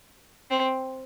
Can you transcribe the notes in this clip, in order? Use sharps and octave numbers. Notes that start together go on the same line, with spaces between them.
C4